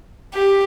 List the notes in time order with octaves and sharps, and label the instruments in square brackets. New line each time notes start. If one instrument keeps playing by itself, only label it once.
[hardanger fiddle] G4